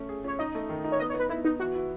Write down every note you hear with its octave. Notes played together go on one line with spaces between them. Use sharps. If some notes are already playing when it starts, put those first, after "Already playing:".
Already playing: A3 C#4
G#4
C#4 C#5
D#4 D#5
A3
D#3
D#4
C#5
B3 D#5
C#5
B3
B4
B3 E4
B3 D#4
E3 F#4
E4